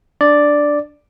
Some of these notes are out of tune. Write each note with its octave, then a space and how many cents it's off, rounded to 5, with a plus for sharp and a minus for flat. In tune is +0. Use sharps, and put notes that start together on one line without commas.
D4 +0 D5 +0